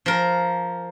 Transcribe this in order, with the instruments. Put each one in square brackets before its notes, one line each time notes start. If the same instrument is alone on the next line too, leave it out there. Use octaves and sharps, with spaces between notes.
[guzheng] F3 A#4